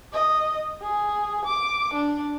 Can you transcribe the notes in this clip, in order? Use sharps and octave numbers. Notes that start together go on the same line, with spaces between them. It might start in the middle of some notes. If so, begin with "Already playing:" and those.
D#5
G#4
D6
D4